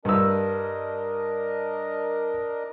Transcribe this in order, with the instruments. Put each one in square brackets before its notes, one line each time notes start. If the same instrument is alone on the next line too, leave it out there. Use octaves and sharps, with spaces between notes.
[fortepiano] G2 E6 [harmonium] D4 A#4 D#5